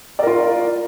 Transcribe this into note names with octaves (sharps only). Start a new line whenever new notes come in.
F4 A#4 D5